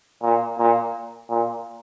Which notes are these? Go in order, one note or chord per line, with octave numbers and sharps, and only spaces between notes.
A#2
A#2
A#2